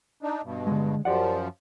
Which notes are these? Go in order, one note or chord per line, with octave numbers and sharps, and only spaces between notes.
D4 D#4
G2 B2
D3 G#3
F#2 F3 G4 D5 F#5